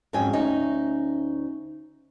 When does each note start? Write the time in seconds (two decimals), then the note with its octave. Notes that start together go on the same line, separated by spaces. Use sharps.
0.13 F2 G#2 F#3 C#4 G5 G#5
0.33 D2 C#4 D#4 G#5